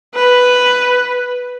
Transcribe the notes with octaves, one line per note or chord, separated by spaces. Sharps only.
B4